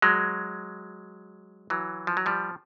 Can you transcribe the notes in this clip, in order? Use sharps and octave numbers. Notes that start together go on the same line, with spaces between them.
F#3 G#3
E3 F#3
F3
F#3
F3 G3